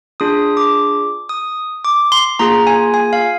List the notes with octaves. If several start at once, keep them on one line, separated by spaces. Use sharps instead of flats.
D4 F4 G#4 D#6
D6
D#6
D6
C6
A#3 F4 G#4 A#5
G#5
G#5
F5